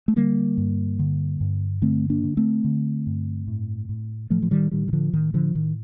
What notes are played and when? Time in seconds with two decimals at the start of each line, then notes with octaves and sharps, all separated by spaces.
0.08 A3
0.16 D3 G3 A#3
0.57 G2
0.99 D3
1.41 G2
1.82 D3 A3 C4
2.10 A#3 D4
2.24 D3
2.37 A3 C4
2.64 D3
3.07 G2
3.48 A2
3.89 A2
4.30 A2 F3 A3
4.42 F3
4.51 D#3 G3
4.71 A2 D#3 G3
4.88 D#3
4.93 D3 F3
5.13 A2 D#3
5.34 D3 F3
5.55 A2 D#3